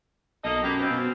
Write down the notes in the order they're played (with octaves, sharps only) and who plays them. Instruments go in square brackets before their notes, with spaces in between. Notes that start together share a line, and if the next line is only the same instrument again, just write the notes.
[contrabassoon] B1 [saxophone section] A#3 A4 D#5
[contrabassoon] F#2 [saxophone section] A#3 B3 G4
[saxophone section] C#3 B3 C4
[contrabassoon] B2